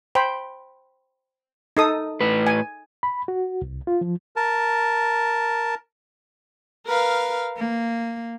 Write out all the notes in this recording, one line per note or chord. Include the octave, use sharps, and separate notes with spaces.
C5 G5 B5
D#4 A4 D#6
A2 B4
G#5
B5
F#4
C2
F4
F3
A#4 A5
A#4 B4 F5
A#3